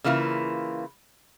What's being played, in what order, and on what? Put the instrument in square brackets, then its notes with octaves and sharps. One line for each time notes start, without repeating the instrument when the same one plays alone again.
[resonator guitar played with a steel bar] C#3 E3 A#3 E4 F4